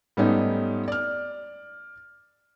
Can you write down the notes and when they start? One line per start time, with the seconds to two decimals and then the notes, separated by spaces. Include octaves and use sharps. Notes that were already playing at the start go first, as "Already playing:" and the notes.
0.17 G#2 G3 A3 B3 C#4 D#4
0.88 D5 F6